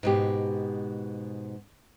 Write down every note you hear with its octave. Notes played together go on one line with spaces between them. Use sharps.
G#2 B2 G4